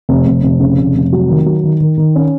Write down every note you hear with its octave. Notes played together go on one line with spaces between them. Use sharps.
F1
F1
F1
C#3
F1
F1
F#3
D#3
F#3
D#3
D#3
D#3
C#4